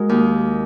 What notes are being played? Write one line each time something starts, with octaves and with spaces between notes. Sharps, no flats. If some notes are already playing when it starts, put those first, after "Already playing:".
Already playing: G#3 F#4 A#4
D#2